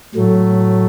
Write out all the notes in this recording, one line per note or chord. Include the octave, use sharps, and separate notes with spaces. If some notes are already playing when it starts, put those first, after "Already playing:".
A2 F#3 A3